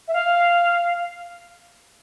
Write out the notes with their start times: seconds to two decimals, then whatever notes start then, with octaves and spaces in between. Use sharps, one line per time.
0.08 E5
0.14 F5